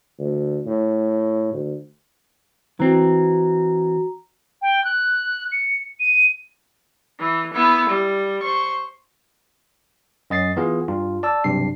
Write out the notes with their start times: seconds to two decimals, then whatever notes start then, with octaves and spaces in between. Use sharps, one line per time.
0.19 D2
0.66 A2
1.53 D2
2.80 E3 C4 F#4 A#5
4.62 G5
4.84 F#6
5.52 C#7
6.00 D#7
7.20 E3
7.54 B3 E4
7.89 G3
8.43 C5 C#6
10.30 F#2 D#5 A6 C7
10.56 E3 B3 F4 G#4
10.88 G2 F4
11.23 D5 A5 E6
11.44 B1 G2 C3 D4 C7